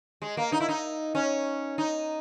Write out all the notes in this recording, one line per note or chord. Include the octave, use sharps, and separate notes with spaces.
G#3
A#3
D#4
E4
D#4
C#4
D#4